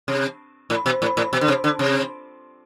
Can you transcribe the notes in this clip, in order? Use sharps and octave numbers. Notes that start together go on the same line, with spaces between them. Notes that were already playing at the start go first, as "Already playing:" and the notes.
C3
A2
B2
A2
A2
B2
D3
C3
D3
C3